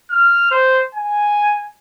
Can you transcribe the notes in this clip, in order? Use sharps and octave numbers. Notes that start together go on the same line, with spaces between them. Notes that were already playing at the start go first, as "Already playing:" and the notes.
F6
C5
G#5